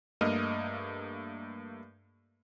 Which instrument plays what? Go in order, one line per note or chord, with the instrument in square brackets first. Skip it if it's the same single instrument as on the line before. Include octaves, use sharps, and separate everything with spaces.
[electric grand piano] G2 A3 A#3 D#5 F6 D#7